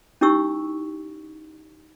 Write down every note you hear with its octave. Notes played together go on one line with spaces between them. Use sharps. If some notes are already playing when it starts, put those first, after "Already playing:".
C#4 D#4 E4 G4 C#6 E6